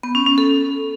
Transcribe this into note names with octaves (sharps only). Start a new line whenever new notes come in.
B3
C#4
C#4
A4